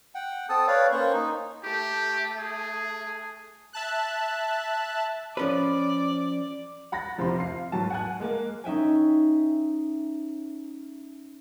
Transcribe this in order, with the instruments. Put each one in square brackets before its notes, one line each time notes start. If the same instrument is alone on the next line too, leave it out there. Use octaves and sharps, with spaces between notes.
[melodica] F#5 G5
C4 A4 A5 D#6
B4 C#5 D5 F5
A#3 C#4 C5 C#6
D#4
[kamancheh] A3 [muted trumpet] G4
[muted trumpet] G#4
[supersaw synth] E5 A5 F#6
[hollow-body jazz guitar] F3 C#4 B4 [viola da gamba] D5
[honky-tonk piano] F#5 B5 A6 A#6
F1 C3 F3 C4 A#5 C6
F5 C7
G#2 F#3 A5
F#5 G#5 F#6
G#3 A#3
[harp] C#4 D#4 E5 G5 G#5